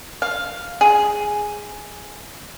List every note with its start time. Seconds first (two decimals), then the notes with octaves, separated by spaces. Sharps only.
0.22 F5
0.81 G#4